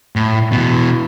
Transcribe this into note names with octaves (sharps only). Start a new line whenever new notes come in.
A2
B2 E3